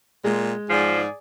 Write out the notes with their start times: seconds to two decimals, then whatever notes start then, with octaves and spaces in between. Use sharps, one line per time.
0.24 A#2 G#3
0.70 G#2 F3 G#4 D5